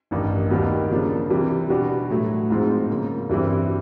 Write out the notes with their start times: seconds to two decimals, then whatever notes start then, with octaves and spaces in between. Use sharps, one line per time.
0.11 A1 G2 D#3
0.51 D#2 D#3 G3 B3
0.91 C#3 F3 A#3 D4
1.30 C3 E3 G3
1.70 B2 G3 B3 D4 F#4
2.10 A2 F#3 A3
2.50 G#2 F3 G#3 C4 F4
2.90 C#3 F#3 A#3
3.29 G2 E3 G3 C4 E4